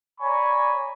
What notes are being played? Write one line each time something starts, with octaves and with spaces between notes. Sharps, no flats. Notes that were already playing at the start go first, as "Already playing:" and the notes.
C#5 D5 G#5 A#5 B5 C#6